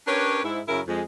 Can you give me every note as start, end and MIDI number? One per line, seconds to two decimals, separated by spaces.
0.06 0.43 61
0.06 0.43 62
0.06 0.43 67
0.06 0.43 70
0.06 0.43 71
0.06 0.43 73
0.44 0.60 44
0.44 0.60 64
0.68 0.80 42
0.68 0.80 49
0.68 0.80 64
0.68 0.80 70
0.88 1.01 41
0.88 1.01 56